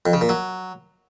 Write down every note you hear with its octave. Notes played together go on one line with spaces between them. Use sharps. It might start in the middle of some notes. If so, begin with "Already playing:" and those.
F2
C#3
A#2
F#3